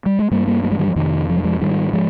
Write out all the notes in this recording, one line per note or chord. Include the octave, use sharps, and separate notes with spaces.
G3
G#3
G2 G3 A#3
G3 A#3
G3 A#3
F3 G#3
D#3 G3
F3
F2 C3 D#3
F3
G3
F3 G#3
G#2 D#3 G3
F3 G#3